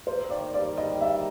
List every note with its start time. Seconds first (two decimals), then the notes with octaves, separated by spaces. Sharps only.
0.07 A#3 C5
0.30 D#3 D5
0.53 G2 D5
0.77 G3 D#5
1.00 A#3 E5